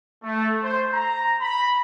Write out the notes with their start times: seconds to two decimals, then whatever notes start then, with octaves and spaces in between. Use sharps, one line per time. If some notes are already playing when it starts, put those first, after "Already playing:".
0.23 A3
0.62 C5
0.92 A#5
1.41 B5